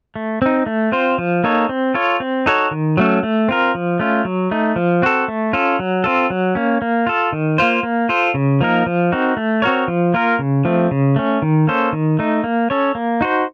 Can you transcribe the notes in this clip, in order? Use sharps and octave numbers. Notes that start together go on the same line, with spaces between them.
A3
C4 D#4
A3
C4 F4 C5
F3
A#3 D#4 A4 C#5
C4
F4 A4 C#5
C4
D#4 F#4 A4 C#5
D#3
F#3 A3 C#4 A4
A3
C4 F4 A#4
F3
A3 C#4 F4
F#3
A3 D#4
F3
C4 F#4 A4
A3
C#4 F4 A4
F#3
C4 F4 A4
F#3
A#3 C#4
A#3
F4 A4
D#3
A#3 F4 C5
A#3
F4 A4 C5
C#3
F3 A#3 D#4 A#4
F3
C4 D#4 F#4 A#4
A3
C4 F#4 A#4 C#5
F3
A#3 F4 A#4
C#3
F3 A3 C4
C#3
A3 C#4
D#3
A#3 C#4 A4 C5
D#3
A3 D#4
A#3
C#4 A4 C#5
A#3
D#4 F#4 C5